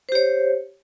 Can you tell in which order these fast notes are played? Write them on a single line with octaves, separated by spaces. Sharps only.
C5 G4 C#5